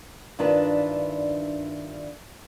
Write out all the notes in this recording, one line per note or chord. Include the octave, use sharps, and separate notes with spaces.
G2 D#3 D4 E4 F4 B4